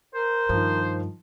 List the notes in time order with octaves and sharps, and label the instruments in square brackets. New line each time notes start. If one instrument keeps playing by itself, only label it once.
[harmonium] A#4 [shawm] C5
[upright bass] G2 [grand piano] D#3 F3